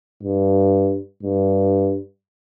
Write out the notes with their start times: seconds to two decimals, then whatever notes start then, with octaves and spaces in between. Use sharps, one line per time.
0.23 G2
1.23 G2